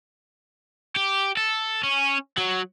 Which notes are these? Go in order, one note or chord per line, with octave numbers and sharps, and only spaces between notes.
G4
A4
C#4
F#3